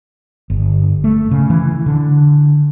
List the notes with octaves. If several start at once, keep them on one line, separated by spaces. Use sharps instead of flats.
G1
A3
C#3
E3
D3